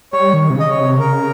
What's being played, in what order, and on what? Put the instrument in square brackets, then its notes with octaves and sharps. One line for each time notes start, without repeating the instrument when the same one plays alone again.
[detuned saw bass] G3 [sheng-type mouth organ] C#5
[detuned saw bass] D#3
C3
[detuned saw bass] C#3 [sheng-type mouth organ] D#5
[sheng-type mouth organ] C#5
[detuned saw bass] C3
[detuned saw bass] C#3 [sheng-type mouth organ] A#4